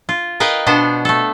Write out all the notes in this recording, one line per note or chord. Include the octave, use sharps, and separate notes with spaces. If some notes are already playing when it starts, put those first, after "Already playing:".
F4
A#4 B4 D#5 F5 G5
B2 B3 D4 C5
A3 A4